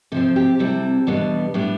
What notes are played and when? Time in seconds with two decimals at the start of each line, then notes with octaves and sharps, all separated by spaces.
0.12 C3 F3 C4 A4
0.36 G4
0.59 C3 G3 C4 E4 A4
1.07 E2 B2 G3 B3 D4
1.54 A2 G3 B3 D4